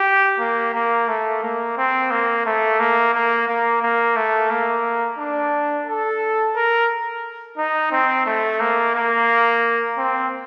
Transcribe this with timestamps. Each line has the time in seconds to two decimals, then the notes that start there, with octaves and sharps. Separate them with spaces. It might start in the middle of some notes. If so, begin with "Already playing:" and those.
Already playing: G4
0.40 A#3
0.74 A#3
1.08 A3
1.43 A#3
1.77 C4
2.11 A#3
2.46 A3
2.80 A#3
3.14 A#3
3.48 A#3
3.82 A#3
4.16 A3
4.50 A#3
5.18 D4
5.87 A4
6.55 A#4
7.58 D#4
7.92 C4
8.26 A3
8.60 A#3
8.95 A#3
9.98 C4